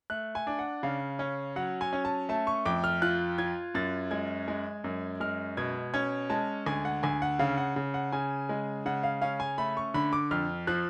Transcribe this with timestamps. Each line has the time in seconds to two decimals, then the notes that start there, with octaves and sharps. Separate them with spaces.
0.10 A3 F#6
0.35 G#5
0.47 D4
0.59 F#5
0.83 C#3 F5
1.19 C#4
1.56 F#3 F#5
1.81 G#5
1.93 C#4
2.05 A5
2.29 A3 A5
2.47 C#6
2.65 F2 D6
2.84 F6
3.02 F4 F#6
3.38 F4 G#6
3.75 F#2 A6
4.11 G#3 G#6
4.48 G#3
4.84 F#2
5.20 G#3 F6
5.57 B2 G#6
5.94 C#4 G#6
6.30 G#3 A5
6.66 D2 G#5
6.85 F#5
7.03 D2 G#5
7.22 F#5
7.39 C#3 F5
7.58 F#5
7.76 C#3
7.94 F#5
8.12 C#3 G#5
8.49 G#3
8.86 C#3 F#5
9.03 F5
9.22 C#4 F5
9.40 G#5
9.58 A3 B5
9.77 C#6
9.94 D3 B5
10.13 D6
10.31 F2 F6
10.67 F3 F#6